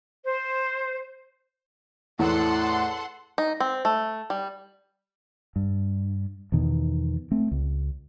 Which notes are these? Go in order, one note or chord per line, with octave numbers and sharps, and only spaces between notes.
C5
E2 A2 A4 F#5 C6
D#4
C4
A3
G3
G2
E2 B2 D#3
A3 C4
C#2